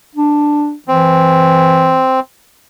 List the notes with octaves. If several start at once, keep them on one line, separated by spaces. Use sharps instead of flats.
D4
E3 C4